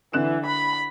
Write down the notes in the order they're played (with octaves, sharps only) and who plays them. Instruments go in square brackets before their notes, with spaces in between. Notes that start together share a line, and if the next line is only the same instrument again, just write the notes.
[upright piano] D3 F#6 E7 [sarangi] E3
[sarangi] B5